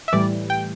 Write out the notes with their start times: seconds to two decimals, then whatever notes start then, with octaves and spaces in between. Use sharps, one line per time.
0.08 E5
0.13 A2 E3 G3 D5
0.50 G5